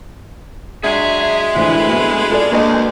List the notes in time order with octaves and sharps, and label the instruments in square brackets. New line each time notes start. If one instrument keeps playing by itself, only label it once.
[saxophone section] F#3 G#4 [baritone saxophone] G#3 [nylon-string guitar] D4 [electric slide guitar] E5
[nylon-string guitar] D2 E3 F3 [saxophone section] D3 B4
[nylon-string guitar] B3 F#4
F4 A4 D5
[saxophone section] D2 [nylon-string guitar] A#3 B4 D#5